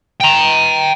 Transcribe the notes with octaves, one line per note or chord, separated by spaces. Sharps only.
G5 A#5